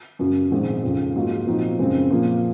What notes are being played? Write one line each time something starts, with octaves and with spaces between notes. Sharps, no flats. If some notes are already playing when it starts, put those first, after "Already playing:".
F#2 C#3 F#3
A#1 G#2 D#3 G#3 C4
F2 C#3 F3
G#2 F#3 A#3 F4
A#2 F3 C4 D#4 F#4
F#2 C#3 G#3 C4
A#2 F3 A#3